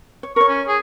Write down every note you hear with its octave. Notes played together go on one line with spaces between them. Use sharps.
C#5
A#4 C#5 C#6
C#4
G#4